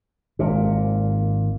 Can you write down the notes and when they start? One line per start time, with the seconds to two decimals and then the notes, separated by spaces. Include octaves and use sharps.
0.39 G#1 A#2